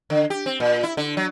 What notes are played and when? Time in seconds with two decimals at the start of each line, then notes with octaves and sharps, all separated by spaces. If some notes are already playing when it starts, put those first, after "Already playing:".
0.10 D3
0.30 G4
0.46 C4
0.60 A#2
0.83 E4
0.97 D3
1.17 F#3